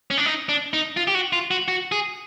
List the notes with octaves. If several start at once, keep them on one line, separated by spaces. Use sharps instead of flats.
C#4
D4
D#4
D4
D#4
F4
G4
F#4
F4
F#4
F#4
G#4